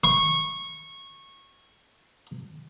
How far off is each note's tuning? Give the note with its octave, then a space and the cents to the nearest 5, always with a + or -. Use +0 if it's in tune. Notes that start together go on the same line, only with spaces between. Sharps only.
C#6 -15